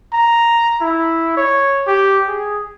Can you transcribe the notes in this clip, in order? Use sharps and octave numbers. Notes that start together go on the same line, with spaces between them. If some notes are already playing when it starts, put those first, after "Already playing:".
A#5
E4
C#5
G4
G#4